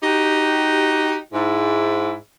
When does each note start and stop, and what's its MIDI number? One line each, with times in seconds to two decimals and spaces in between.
0.03 1.16 63
0.03 1.16 66
0.03 1.16 67
1.33 2.15 44
1.33 2.15 64